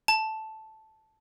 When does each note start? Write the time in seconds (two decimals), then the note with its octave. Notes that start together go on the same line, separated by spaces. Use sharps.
0.08 A5